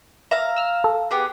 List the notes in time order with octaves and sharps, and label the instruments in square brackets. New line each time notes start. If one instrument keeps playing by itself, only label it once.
[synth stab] E5 [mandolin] F5 A#5
[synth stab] E6 F6
A4
[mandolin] B3 G4 G#4